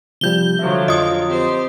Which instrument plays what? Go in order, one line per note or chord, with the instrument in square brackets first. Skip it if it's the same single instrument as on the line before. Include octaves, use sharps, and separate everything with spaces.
[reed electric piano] C3 F3 G3 [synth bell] G6 G7
[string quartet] D3 F3 F#3 [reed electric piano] E5
[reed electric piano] F2 F4 [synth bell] D#5 D#6
[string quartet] C4 G4 C5